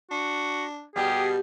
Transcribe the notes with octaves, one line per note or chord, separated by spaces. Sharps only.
D4 F#4
B2 G3 G4 G#4